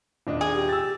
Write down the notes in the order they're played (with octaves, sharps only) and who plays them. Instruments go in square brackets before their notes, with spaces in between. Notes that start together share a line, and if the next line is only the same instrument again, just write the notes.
[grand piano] D#1 D4 D#5
[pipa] G#4
[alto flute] G4
[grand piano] E6 A6